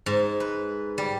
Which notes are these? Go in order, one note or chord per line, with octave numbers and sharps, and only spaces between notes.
G#2
B4
G3